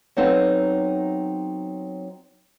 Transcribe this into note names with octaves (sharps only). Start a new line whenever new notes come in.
F#3 B3 C4 D#4 A4 F5